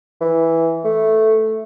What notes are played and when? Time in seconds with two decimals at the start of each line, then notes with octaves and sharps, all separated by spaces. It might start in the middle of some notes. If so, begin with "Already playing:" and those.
0.21 E3
0.84 A3